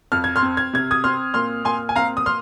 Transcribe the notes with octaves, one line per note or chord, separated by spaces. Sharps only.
F2 F6
G#6
C6 F6
C4
G#6
C3 G#6
D#6 G#6
C4 C6 F6
A#2 C6 F6
A#2 G#5 C6
G#5
C4 F5 A#5
D#6
C6 F6